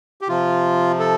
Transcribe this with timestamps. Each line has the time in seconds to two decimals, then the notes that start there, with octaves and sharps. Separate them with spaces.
0.21 G4
0.28 C3 F3 F4
1.00 A4